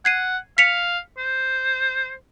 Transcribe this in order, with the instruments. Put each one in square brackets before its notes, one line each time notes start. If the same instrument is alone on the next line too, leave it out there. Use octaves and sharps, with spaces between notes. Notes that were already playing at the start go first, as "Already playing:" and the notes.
[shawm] F#5 [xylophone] G#6 C7 D#7
[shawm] F5 [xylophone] B6 C#7 F7
[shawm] C5